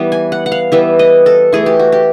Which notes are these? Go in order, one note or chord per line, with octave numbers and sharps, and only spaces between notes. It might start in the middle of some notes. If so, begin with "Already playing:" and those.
Already playing: E3 G3 B3
G#5
F#5
F#5
F5
E3 G3 B3 E5
D#5
A4
E3 A3 G#4
G4
F#4
G4